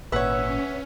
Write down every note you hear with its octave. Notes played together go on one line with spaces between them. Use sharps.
G#1 A#2 C#4 B4 C#5 E5 F#5